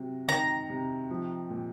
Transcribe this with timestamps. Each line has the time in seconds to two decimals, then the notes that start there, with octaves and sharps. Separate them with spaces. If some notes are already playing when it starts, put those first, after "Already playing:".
Already playing: C3 F#3
0.28 D#3 A#5
0.69 C3
1.10 F3
1.50 A#2